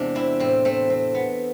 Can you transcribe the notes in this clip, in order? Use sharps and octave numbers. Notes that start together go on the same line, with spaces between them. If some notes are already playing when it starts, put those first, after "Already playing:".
Already playing: E2 C3 G#3 D4
C4 E4
A2 C4
A3 C4
C4
B3